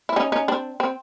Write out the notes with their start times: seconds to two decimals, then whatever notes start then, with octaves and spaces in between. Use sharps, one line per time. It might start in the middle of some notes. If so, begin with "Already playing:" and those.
0.09 E4
0.16 C#4 D#4
0.32 C#4 D#4
0.48 C4 D4
0.80 C4